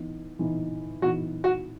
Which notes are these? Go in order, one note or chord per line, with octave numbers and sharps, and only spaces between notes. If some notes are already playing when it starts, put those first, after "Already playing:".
Already playing: E3 B3 D#4
E3 B3 D#4
E3 B3 D#4 F#4
F#4